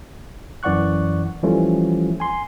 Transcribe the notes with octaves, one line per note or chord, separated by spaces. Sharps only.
F#2 E3 D5 F#5 C#6 F#6
E3 F3 G3 A3 C#4 F4
G#5 C6